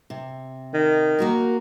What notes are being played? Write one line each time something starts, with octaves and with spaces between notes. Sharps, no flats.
C3
D#3
A#3 F#4 A#4